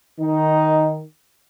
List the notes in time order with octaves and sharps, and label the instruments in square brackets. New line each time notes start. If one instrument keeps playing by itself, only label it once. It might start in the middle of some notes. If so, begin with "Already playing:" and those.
[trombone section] D#3 D#4